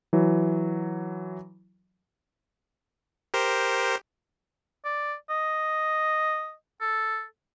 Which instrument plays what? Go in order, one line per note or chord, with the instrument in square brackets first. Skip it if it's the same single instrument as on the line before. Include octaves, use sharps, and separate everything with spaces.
[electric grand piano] E3 F#3
[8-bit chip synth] G4 A#4 C5
[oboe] D5
D#5
A4